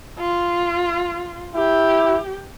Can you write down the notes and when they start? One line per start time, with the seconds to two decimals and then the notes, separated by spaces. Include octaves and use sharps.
0.19 F4
1.56 E4 G4